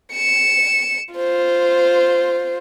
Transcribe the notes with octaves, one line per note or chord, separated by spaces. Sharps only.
C#7 E7
F4 C5